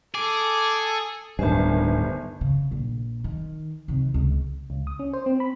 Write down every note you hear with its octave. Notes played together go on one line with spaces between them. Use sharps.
G#4 A4 D6
D1 G1 G2 D#3 C5 E5 G#5 A5
C#3
A#1
D#3
C3 D#3
C#2
C#2
D#6
C#4
C5
C4
B5